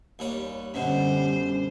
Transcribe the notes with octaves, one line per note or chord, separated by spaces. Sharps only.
D#2 G3 C#5
F#2 B2 D3 G3 C#4 C5